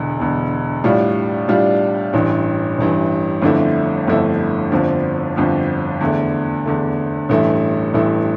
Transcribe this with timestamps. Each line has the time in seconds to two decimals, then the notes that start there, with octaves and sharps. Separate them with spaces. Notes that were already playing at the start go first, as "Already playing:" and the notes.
Already playing: E1 E2 D3
0.19 E1 E2 D3
0.84 A2 G3 D4 F4
1.48 A2 G3 D4 F4
2.13 A1 G2 E3
2.78 A1 G2 E3
3.42 G1 F2 D3 A3 E4
4.07 G1 F2 D3 A3 E4
4.72 G1 F2 D3 F3
5.36 G1 F2 D3 F3
6.01 E2 D3 A3
6.66 E2 D3 A3
7.29 A1 G2 E3 A3
7.94 A1 G2 E3 A3